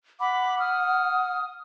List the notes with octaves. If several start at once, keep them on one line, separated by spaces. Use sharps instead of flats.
F#5 B5 D6
D#6 F6